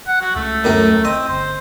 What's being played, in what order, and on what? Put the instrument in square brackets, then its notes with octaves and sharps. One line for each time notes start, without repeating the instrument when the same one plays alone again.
[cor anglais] F#5
F#4
[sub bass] C#2 [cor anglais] A3
[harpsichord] F#2 A2 A#4
[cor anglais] C4 [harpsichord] D#5
[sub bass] G1 [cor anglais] C5